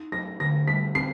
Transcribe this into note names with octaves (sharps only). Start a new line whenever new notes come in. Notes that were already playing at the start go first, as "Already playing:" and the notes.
Already playing: D#4
F#3 A#6
D3 A#6
G3 B6
C4 C7